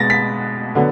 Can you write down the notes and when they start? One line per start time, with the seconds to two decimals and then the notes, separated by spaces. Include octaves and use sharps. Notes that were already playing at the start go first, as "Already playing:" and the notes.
Already playing: B2 G#3 B3 A6 A#6
0.10 B6
0.75 D3 F#3 B3